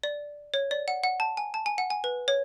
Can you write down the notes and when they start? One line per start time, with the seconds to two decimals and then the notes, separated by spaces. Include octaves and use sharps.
0.03 D5
0.54 C#5
0.71 D5
0.88 F#5
1.04 F#5
1.20 A5
1.37 G#5
1.54 A5
1.66 G#5
1.78 F#5
1.90 G#5
2.04 B4
2.28 C#5